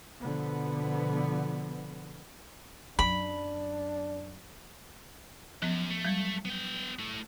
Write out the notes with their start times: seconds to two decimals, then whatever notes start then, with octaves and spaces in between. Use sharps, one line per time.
0.22 B2 D3 F3 B3
2.99 F#2 F#3 D4 B5
5.62 F#2 F3 B3
5.90 A3
6.05 F#3 G3
6.45 B3 G5
6.99 A3 E4